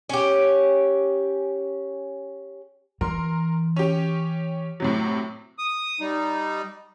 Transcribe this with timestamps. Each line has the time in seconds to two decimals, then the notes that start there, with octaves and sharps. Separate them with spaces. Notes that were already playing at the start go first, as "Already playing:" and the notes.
0.09 C#4 G4
3.01 E3 A#4 C6
3.76 C#4 G4
4.80 A2 C3 F#3
5.59 D#6
6.00 G3 D#4